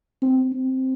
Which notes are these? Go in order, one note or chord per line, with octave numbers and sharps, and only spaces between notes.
C4
C4